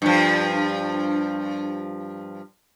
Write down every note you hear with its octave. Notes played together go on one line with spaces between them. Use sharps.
G2 F3